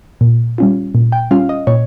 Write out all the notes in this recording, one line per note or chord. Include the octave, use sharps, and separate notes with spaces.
A#2
G3 C#4 F4
A#2
G5
G3 C#4 F4 F5
D#5
A#2 C#5